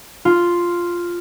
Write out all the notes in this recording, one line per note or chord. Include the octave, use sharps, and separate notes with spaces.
F4